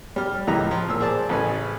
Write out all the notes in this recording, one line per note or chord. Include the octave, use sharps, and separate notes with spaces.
G3 F6
C#2 A2 E3 G4 D#5 A#5
F3
A#2 E6
G#4 C5 D5 A5
A1 C#3 A4 B4 G#5